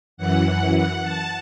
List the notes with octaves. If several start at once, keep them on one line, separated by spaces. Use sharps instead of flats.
F#2 E3 F#5
F#5
F#5
A5